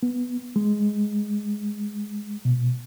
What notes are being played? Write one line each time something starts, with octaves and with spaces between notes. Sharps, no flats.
B3
G#3
B2